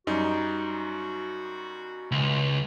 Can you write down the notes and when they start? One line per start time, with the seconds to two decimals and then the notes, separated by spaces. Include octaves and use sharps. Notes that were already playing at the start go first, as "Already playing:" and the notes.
0.07 F#2 G3 D#4 F#4
2.12 C#2 C6